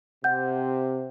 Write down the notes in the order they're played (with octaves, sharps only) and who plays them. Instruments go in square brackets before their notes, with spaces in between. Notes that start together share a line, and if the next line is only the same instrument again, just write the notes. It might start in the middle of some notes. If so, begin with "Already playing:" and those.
[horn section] C3 [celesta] F#5 G6